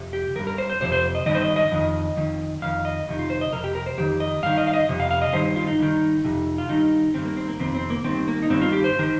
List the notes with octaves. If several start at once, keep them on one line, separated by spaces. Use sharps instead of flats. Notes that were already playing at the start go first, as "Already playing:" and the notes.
Already playing: F2 C3
G4
D#3 A#4
G2
A#4
C5
C5
F2 C3 C5
C5
D#5
G2 D#3 D#5
C5
D#5
D#5
F2 D#3
F2 D#3
F2 D#3 F5
D#5
F2 C3 D#3
F4
C5
D#5
F2 C3 A#4
G4
A#4
C5
F2 D#3 G4
D#5
G2 D#3 F5
D#5
F5
D#5
F2 C3
F5
F5
D#5
G2 D#3 C5
F4
D#4
G2 D#3
F2 C3
F4
G2 D#3 D#4
G2 D#3 C4
A#3
C4
A#3
F2 C3 D#3 C4
C4
A#3
G2 D#3 C4
A#3
D#4
G2 D#3 C4
F4
G4
C5
D#3